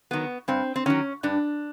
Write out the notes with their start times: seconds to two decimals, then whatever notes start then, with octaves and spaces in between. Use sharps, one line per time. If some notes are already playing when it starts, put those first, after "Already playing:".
0.11 D#3 F#3 B3
0.48 G2 C4
0.76 C4
0.86 D#3 F#3 C#4
1.23 G2 D4